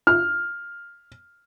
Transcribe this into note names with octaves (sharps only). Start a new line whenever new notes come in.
F6